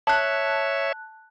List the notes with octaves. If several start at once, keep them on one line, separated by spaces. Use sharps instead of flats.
C#5 E5 A5 F#6